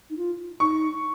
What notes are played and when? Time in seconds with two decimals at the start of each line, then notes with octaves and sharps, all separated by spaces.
0.10 D#4
0.17 F4
0.60 D#4 C#6